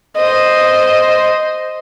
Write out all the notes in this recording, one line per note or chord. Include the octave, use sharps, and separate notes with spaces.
C5 D#5